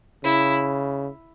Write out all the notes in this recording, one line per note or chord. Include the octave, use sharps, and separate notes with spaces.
C#3 E4